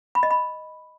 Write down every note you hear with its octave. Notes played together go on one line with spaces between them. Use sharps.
B5
D#5
B5